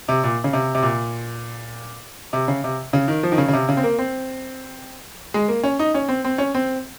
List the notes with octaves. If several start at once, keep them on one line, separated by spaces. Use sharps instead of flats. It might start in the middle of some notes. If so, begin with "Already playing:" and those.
C3
A#2
C#3
C3
C3
A#2
C3
C#3
C3
C#3
D#3
F3
D#3
C#3
C#3
C3
C#3
C4
A#3
C4
G#3
A#3
C#4
D#4
C#4
C4
C4
C#4
C4